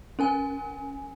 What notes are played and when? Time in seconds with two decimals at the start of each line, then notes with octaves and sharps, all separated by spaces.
0.19 C#4 A#4 G#5